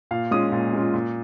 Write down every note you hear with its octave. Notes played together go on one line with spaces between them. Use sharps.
A#2 F5
G#3 C#4 F4 D#6
A#2
G#3 C#4 F4
A#2